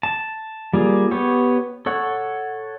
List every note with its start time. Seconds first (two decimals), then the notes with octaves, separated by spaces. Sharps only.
0.03 A5
0.73 G3 A#3 F4 G#4
1.11 B3 G4 C#5
1.86 A4 C#5 F#5